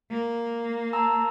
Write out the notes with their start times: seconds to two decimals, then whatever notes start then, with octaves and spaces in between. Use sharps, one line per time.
0.11 A#3
0.93 A5 A#5 E6